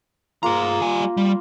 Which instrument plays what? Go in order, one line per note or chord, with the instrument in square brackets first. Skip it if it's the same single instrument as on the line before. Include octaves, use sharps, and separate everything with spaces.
[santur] A#3 F4 [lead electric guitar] G#4 A#5
[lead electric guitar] G3 G#5
G3